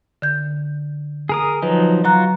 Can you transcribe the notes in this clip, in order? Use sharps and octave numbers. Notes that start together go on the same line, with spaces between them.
D3 G6
G#4 A#4 D#6
F3 F#3 D#4 B4
F#3 F4 F#4 A#5 F#6